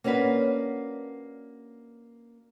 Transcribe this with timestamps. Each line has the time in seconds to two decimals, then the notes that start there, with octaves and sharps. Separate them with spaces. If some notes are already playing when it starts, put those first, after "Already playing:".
0.04 A#3 C#4 D4 F#4 B4